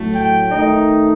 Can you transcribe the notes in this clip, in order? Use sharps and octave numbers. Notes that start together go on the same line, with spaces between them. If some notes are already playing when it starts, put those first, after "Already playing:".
Already playing: A2 F#3 A3
G5
D#3 A3 D#4